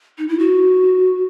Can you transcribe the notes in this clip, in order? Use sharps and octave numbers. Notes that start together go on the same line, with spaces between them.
D#4
E4
F#4